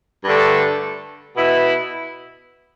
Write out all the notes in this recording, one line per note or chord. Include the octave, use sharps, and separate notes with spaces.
G2 D3 A3
B2 B3 E4